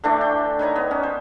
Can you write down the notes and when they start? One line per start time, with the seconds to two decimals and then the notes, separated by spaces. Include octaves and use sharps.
0.04 D3 E3 A3 D4
0.21 G5
0.59 D#3 B4 C#5 A#5
0.76 B3
0.91 C#4
1.03 C5